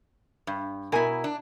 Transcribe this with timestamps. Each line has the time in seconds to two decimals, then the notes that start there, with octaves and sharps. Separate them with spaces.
0.47 G2
0.92 B2 E4 A#4 G#5
1.24 D4